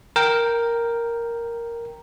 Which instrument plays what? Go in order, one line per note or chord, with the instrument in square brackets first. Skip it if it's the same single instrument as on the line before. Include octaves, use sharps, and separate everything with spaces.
[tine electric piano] A#4 G5